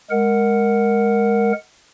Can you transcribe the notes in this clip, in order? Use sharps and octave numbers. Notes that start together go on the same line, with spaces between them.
G#3 A#4 F#5